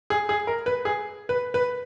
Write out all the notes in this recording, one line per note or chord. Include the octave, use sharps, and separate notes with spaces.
G#4
G#4
A#4
B4
G#4
B4
B4